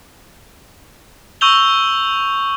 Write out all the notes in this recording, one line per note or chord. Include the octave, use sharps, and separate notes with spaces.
C#6 E6 G6 F7 G7